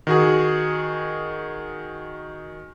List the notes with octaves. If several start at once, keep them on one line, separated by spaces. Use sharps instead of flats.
D#3 F#4 G#4